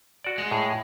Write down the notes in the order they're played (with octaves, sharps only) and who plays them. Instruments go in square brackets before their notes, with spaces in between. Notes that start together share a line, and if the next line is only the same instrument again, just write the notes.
[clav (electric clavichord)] F#4 D5
[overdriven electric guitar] G#3
[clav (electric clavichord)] A2 G#4